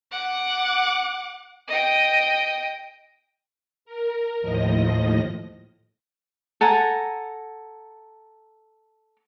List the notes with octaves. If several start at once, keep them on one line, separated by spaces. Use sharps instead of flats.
F#5 D6
D#5 G5
A#4
D#2 A2 F3 D#5 A#6
A4 F#5 G#5 A#5